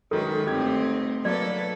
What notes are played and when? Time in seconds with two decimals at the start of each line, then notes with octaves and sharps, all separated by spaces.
0.11 F#2 D#3 G#3 F#4 A4 B4
0.46 G1 A3 C4 D#4 G4 G#6
1.25 F#3 A#3 D#4 A4 B4 D5